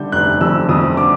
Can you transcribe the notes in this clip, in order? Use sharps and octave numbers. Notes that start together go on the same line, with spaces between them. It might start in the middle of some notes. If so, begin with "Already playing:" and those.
Already playing: D3 G3 G6
F1 F#6
F2 E6
F2 D#6
D3 D6